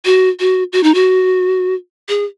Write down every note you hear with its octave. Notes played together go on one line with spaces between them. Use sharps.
F#4
F#4
F#4
D#4
F#4
G#4